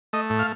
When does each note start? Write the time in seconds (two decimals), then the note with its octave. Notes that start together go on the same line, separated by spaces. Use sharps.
0.13 A3 D#5
0.30 A2
0.39 F5